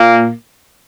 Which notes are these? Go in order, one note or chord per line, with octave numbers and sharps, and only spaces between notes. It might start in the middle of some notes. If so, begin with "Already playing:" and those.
Already playing: A#2 A#3